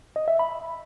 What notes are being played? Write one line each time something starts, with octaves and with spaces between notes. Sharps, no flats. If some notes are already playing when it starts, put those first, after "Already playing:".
D#5
E5
B5